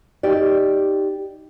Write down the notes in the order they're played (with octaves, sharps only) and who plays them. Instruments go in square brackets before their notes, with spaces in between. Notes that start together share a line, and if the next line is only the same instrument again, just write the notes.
[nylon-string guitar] D#4 G4 D5